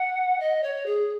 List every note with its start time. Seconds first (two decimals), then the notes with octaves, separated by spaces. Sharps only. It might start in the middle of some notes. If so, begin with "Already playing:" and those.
Already playing: F#5
0.39 D#5
0.63 C#5
0.86 G#4